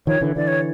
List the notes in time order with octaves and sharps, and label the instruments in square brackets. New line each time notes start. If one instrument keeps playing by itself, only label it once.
[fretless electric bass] D#3 F3 [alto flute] C#5
[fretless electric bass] D3 E3
[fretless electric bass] D3 E3 [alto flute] D5
[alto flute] C#5